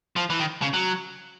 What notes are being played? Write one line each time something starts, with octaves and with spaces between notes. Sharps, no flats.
F3
E3
D#3
C#3
F#3